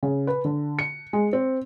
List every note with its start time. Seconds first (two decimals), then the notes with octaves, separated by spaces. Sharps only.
0.03 C#3
0.27 B4
0.45 D3
0.79 C#7
1.13 G#3
1.33 C4